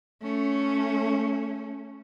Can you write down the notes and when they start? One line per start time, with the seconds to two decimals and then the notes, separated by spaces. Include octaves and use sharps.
0.23 A3 C#4